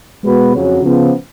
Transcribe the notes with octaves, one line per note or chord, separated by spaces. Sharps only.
B2 G#3 B3 F#4 B4
F2 C#3 F#3
C#3 F3 B3